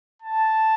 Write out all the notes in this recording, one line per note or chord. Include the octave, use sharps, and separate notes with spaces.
A5